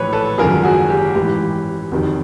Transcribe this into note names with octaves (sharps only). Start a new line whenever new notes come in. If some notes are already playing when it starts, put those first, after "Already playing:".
Already playing: A#1 A2 E3 B4 C#5
A4 B4
G#1 F#2 C#3 F3 G#4 A#4
F#4 G#4
G4
A1 G#2 E3 G4
F#1 F2 C3 D#3 F#3